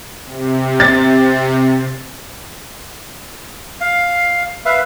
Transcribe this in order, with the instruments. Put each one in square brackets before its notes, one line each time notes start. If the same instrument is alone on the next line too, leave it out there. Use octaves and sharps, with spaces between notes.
[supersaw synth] C3
[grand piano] A6
[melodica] F5
B4 E5 F5